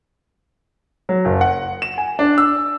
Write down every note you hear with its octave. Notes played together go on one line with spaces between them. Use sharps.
F#3
F#1
F#5
E7
G#5
D4
E6